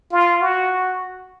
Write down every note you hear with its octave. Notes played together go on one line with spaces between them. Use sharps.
F4
F#4